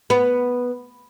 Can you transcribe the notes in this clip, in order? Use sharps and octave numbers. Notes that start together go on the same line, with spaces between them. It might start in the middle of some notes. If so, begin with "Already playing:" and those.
B3